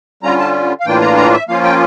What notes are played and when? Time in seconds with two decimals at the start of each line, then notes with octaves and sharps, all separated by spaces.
0.23 D3 G3 C#4 F4 A#5
0.39 A5
0.80 F5
0.86 A2 E3 A#3 D4 F4 G5
1.02 A#5
1.17 A#5
1.33 E5
1.48 F3 A#3 C#4 F4 F5
1.64 G5